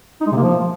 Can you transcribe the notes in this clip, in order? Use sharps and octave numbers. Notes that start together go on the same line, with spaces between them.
D#4
G#3
C3
A#3
F3